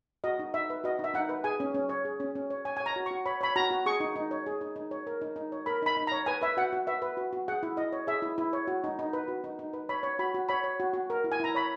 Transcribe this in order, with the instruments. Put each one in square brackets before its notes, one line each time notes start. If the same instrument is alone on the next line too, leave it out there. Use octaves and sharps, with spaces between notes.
[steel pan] F#4 D#5
D#4
D#4 E5
B4
F#4 D#5
D#4
E5
D#4 F#5
B4
G#4 G#5
C#4
C#4
C#5
G#4
C#4
C#4
C#5
C#5 G#5
G#5
C#5
A#5
F#4
C#6
F#4
C#5 B5
C#5 B5
F#4 A#5
F#4
G#4 C#6
D#4
D#4
C#5
G#4
D#4
D#4
C#5
A#4
D#4
D#4
C#5
A#4 B5
D#4 B5
D#4
A#5
C#5
B4 G#5
B4 E5
F#4 F#5
F#4
B4 E5
B4
F#4
F#4
G#4 F#5
E4
E4 D#5
C#5
G#4 E5
E4
E4
C#5
F#4
D#4
D#4
B4
F#4
D#4
D#4
B4
C#5 B5
C#5
F#4 B5
F#4
C#5 B5
C#5
F#4
F#4
A#4
E4
G#5
E4 A#5
C#5 B5